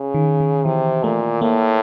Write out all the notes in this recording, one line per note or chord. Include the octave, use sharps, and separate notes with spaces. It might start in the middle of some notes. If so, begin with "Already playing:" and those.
Already playing: C#3
D#3
D#3
C3 E3
A#2 A3
A2 A#3